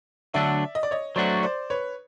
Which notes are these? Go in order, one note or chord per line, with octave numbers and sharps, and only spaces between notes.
D3 F#3 A3 D4 D5 E5
D#5
D5
C#5 D#5
F#3 A3 D4 F#4 C5 D5
C5 D5
B4 C#5